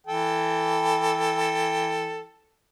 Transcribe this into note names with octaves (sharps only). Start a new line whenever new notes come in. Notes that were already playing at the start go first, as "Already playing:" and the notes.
E3 A4 G5